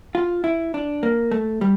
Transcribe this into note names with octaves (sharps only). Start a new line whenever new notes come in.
F4
E4
D4
A#3
A3
G3